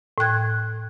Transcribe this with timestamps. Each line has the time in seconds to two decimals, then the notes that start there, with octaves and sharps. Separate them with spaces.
0.18 A2 G5 F#6 G#6